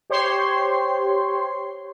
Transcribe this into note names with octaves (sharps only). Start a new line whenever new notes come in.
G4 C5 C#5 C6